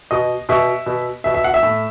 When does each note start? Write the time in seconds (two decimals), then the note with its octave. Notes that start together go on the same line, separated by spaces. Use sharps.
0.11 B2 D#5
0.49 B2 E5
0.86 B2
1.24 B2 E5
1.34 E5
1.44 F#5
1.54 E5
1.63 A2